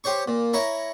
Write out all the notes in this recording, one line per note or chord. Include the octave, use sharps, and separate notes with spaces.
G4 C5 C#5 C#6
A#2
E4 C#5 A#5 C#6